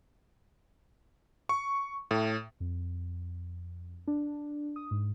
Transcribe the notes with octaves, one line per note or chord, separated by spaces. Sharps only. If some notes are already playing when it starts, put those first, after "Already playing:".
C#6
A2
F2
D4
D#6
G#2